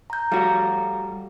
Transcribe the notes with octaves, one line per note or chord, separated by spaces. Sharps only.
A#5 G6
G3 F#4 A4 F5 A#5